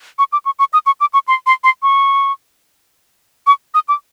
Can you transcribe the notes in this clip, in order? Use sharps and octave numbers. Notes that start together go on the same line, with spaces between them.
C#6
D6
C#6
C#6
D#6
C#6
D6
C#6
C6
C6
C6
C#6
C#6
D#6
D6